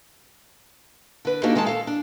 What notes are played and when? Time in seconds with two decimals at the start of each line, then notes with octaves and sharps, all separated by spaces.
1.25 D3 B4
1.43 A#3 D4 D#4 F#4 G4 A4
1.55 D#3 G#3 G#4 A4 A5
1.66 A4 F5
1.87 D4